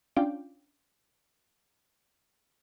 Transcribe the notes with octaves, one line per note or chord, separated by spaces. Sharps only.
C#4 D4 F4 F5 G5 D6